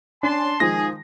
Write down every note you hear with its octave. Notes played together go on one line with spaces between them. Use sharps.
C#4 D4 A5 C6
D#3 F3 G#3 G#4 A#6